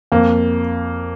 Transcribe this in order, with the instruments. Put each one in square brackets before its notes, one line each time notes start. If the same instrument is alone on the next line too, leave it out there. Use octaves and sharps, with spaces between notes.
[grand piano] F2 A#3